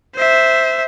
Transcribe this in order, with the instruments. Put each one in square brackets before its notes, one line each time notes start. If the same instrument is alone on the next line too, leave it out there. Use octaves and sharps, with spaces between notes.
[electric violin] C5 E5